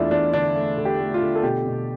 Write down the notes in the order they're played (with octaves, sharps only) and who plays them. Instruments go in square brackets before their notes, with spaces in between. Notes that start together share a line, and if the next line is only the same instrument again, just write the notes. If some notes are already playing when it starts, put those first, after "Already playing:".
Already playing: [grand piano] E2 A3 D4 E4 F4
E2 D4
D3 D4
A3
D3
G4
A3
F4
D3
A4
B2 G4
B2